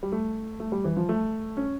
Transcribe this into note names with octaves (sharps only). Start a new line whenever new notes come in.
G3
A3
A3
G3
E3
F3
A3
C#4